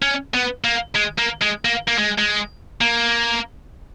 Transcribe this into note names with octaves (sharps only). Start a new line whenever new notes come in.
C#4
B3
A#3
G#3
A#3
G#3
A#3
A#3
G#3
G#3
A#3